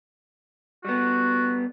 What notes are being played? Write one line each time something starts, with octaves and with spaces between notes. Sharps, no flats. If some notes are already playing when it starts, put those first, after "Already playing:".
G3 B3 F#4